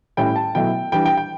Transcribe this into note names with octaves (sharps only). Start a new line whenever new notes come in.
A2 G3 C#4 E4 G5
A5
B2 F#3 A3 E4 G5
E3 G3 D4 G5
G5
G5